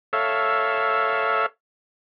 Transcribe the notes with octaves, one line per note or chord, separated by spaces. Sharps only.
A4 C#5 E5 F5